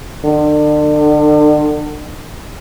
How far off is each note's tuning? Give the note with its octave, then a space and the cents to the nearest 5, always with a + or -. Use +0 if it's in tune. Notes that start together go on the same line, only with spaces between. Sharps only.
D3 +35